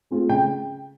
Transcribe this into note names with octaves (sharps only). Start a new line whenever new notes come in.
A3 C4 F4 G#4
C#3 G5